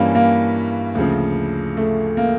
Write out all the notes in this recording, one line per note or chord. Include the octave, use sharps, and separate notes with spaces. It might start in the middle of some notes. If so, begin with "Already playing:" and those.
Already playing: G2 E3 G3 A#3 C#4
A#3
D2 C#3 F3
A3
A#3